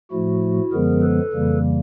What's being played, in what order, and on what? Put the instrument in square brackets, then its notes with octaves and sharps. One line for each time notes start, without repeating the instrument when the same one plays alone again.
[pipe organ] A2 F3 A3 E4 F#4
F#2 D3 F3 G#3 B3 G#4 A#4
A4 B4
F2 C#3 E3 G3 A#3